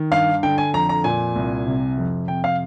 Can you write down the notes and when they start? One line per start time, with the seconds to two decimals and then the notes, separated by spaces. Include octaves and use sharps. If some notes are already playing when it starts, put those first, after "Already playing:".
Already playing: D#3
0.11 G2 F5
0.43 D3 G5
0.58 G#5
0.73 F2 A#5
0.89 A#5
1.04 A#2 G#5
1.36 C2
1.67 C3
1.97 F2
2.28 C3 G5
2.44 F5